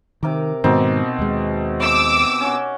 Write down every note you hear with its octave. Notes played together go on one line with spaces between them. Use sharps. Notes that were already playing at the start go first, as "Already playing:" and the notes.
C3 D#3 A#4 D6
G#2 B2 D#3 C4 D#4 D5
D#2 G#3
D6 E6
C#4 F#4